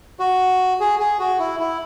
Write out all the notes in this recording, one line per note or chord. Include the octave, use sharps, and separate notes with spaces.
F#4
G#4
G#4
F#4
E4
E4